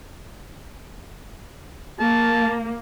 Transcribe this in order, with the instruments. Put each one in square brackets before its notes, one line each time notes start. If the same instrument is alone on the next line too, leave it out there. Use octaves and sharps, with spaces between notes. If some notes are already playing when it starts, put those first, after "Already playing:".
[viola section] A#3 [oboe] A5